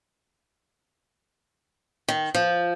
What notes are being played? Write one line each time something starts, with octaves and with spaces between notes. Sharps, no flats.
D#3
F3